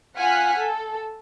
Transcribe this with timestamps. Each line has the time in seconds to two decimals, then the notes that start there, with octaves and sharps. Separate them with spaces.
0.16 F4 F#5 G#5 F6 F#6 B6
0.56 A4